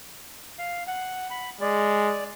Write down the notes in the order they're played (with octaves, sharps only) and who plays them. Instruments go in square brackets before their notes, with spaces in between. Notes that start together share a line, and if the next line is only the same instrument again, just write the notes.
[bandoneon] F5
F#5
B5
[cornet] G#3 [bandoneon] D5